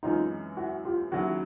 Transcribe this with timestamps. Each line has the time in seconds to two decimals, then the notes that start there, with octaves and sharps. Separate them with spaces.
0.03 F#2 C#3 E3 G#3 C4 D#4 F4
0.57 E4 F#4
0.85 F4 G4
1.12 D#2 C#3 F#3 E4 F#4